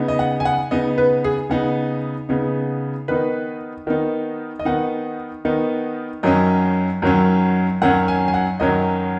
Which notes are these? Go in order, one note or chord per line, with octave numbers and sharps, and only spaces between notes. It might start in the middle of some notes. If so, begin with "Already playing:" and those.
Already playing: C#3 B3 D#4
D#5
F#5
G#5
F#5
C#3 B3 D#4 D#5
B4
G#4
C#3 B3 D#4 F#5
C#3 B3 D#4
D#3 B3 D#4 B4
D#3 B3 D#4
D#5
D#3 B3 D#4 F#5
D#3 B3 D#4
F#2 D#3 F#3 C#4 D#5
F#2 D#3 F#3 C#4
F#2 D#3 F#3 C#4 F#5
G#5
G#5
F#5
F#2 D#3 F#3 C#4 D#5